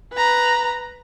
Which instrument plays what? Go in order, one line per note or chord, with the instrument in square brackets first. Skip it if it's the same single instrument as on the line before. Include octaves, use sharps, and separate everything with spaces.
[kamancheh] B4 A#5